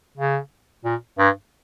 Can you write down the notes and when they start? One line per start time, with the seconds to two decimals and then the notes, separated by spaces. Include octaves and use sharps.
0.18 C#3
0.85 A#2
1.19 G2